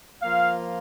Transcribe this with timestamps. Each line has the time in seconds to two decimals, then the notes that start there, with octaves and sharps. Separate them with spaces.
0.22 F3 A#3 F4 F5